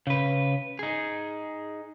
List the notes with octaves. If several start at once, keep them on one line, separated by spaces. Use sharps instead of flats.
C#3 B4
D#4 G#4